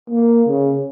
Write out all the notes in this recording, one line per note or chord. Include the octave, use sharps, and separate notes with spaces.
A#3
C#3